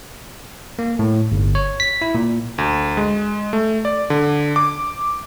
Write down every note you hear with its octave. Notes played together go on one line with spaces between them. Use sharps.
A#3
A2
G1
C#5
B6
E4
A#2
D2
G#3
A3
D5
D3
D6